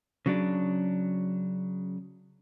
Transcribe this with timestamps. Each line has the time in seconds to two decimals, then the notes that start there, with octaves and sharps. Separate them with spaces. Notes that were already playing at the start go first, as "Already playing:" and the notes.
0.26 C#3 F#3 D4